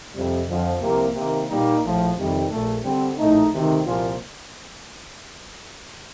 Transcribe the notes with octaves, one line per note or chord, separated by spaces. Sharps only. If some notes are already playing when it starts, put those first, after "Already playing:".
F2 C3 G3
F2 D3 F3
C2 C3 F3 A#3
C3 D#3 A#3
A#2 G3 A#3 D#4
A#1 A2 F3
F2 C3 D#3 G3
A#1 A#2 A3
D3 G3 C4
A#1 A2 A3 D#4
D2 C3 D#3
C2 A#2 F3 A#3 F4